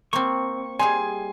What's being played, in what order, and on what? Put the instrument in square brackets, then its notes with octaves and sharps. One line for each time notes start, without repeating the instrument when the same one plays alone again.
[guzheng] A#3 C4 [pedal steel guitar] C#6
[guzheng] G3 D#4 G#4 [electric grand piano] G#5 C6